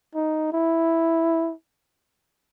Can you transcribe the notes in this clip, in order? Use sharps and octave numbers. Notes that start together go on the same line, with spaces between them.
D#4
E4